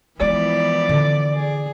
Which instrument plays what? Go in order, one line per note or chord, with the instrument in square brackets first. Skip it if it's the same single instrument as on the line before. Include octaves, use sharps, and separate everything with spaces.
[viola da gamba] E3 F3 B3 [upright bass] G#3 E4 [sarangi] D5
[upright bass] D3
[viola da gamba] G#4